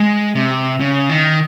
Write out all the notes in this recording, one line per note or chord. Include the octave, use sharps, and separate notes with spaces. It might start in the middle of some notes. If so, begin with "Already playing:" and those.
Already playing: G#3
C3
C#3
D#3